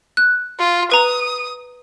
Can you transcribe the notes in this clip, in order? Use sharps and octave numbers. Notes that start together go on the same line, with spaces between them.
F#6
F4
B4 A#5 D#6